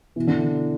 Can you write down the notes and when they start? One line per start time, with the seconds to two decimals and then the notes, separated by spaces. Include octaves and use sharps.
0.16 B2 E3
0.27 D3